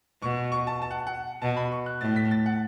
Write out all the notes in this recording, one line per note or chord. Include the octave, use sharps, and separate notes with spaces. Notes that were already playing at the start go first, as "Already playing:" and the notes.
B2 C#6
C#6
A5
A5
F#5
F#5
B2 A5
B5
C#6
F#6
A2 A6
B6
A6
F#5